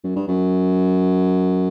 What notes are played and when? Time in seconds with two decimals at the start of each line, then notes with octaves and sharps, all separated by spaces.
0.04 F#2
0.16 G2
0.28 F#2